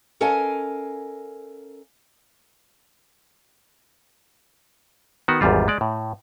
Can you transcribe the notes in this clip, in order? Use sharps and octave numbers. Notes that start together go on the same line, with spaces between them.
C#4 A4 A#4 D#5 F5 G#5
D#3 B3 F#4
G#1 E2 G#2 G3 F4
G#3 D5
A2